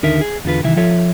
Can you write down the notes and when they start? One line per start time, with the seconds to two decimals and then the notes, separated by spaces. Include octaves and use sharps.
0.03 D#2 D3 D#4 A#4 E5
0.21 G#4
0.45 E2 D3 F4 B4
0.63 C2 D#3 E3 E4 E5
0.77 F3 F4 A4 C#5 E5